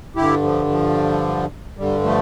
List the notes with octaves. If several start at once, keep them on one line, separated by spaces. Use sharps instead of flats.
G2 D3 E4 G4
F3 A3
F3
G2 D3 G3
F3 A3